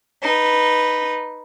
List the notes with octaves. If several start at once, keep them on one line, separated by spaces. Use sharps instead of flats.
D#4 B4